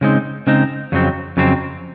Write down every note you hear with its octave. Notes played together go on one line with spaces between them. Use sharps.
C#3 G#3 C4 D#4
C#3 G#3 C4 D#4
F2 C#3 F#3 C4
F2 C#3 F#3 C4